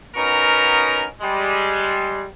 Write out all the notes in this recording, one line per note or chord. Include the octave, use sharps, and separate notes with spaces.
B3 C#4 D#4 F#4 A#4
G3 G#3